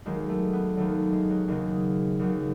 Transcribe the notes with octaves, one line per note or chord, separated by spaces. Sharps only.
D#2 D#3 F#3 G#3
A3
B3
D#2 D#3 F#3 A3
G#3
F#3
D#2 C#3 F#3 G#3
D#2 C#3 F#3